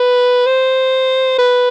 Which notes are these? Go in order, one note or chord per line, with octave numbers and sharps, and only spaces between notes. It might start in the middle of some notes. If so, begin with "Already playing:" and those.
Already playing: B4
C5
B4